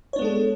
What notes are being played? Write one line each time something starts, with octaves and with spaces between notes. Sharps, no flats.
G#3 B3 D4 A4 C#5